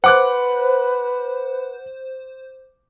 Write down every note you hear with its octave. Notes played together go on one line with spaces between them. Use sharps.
B4 C5 F#5 D6 F#6